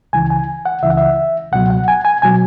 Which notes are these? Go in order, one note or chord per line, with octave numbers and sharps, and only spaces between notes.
C#2 C#3 E3 G#5
G#5
F#5
C#2 C#3 E3 E5
F#5
E5
C#2 B2 F#3 F#5
F#5
G#5
G#5
B2 F#3 G#5